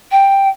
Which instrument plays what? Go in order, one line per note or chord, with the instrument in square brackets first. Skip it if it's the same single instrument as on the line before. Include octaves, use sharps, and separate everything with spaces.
[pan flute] G5